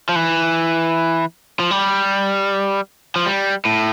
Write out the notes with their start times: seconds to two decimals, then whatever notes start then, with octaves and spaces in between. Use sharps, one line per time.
0.09 F3
0.16 E3
1.60 F3
1.71 G3
3.16 F3
3.26 G3
3.65 A2